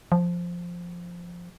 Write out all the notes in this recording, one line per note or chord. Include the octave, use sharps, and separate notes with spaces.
F3